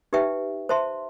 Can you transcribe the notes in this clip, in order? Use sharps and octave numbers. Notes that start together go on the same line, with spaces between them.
D#4 G4 B4 E5 G5
C5 E5 A5 C6